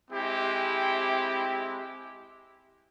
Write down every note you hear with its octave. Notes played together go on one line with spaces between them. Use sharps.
G#3 C4 E4 G4